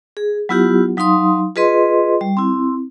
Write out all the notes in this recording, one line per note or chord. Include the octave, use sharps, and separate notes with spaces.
G#4
F#3 B3 E4 F4 G4 F#5
F#3 D#4 F5 C6 D#6
F4 G#4 B4 D#5 C6
G3
C4 E4